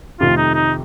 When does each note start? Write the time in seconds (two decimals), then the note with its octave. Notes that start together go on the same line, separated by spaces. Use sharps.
0.20 F2 C3 D#3 A3 F4
0.37 D#4
0.54 D#4